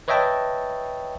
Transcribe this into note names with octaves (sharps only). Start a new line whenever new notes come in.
B4 C#5 D#5 E5 G5 A5